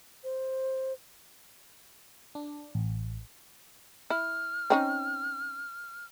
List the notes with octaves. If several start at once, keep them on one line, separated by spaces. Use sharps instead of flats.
C5
D4
A1
E4 F6
C4 C#4 D#4